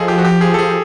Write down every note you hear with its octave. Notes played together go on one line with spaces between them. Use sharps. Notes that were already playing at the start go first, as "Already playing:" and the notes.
Already playing: F3 G#4 A4 D#5
G4
F#4
G4
G#4
A4
F3 G#4